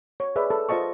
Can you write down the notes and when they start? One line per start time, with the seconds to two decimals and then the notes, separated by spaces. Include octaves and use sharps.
0.20 C#5
0.36 G#4 B4 D5 E5
0.50 A4
0.69 F4 C5 D#5 A5 C#6